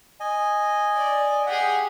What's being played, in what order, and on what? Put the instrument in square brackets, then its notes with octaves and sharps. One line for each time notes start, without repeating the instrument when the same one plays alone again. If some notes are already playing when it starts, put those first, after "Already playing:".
[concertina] D#5 G#5
[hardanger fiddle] D5
[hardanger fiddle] G4 G#4 [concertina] F#5